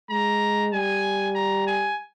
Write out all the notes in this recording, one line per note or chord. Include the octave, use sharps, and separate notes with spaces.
G#3 A#5
G3 G#5
A#5
G#5